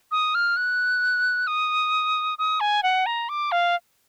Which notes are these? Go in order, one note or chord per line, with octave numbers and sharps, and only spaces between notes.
D#6
F6
F#6
D#6
D#6
G#5
F#5
A#5
D6
F5